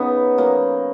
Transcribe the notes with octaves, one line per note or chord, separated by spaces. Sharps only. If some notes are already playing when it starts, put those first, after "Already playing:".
Already playing: C#3 F#3 B3 D#4
F#3 A#3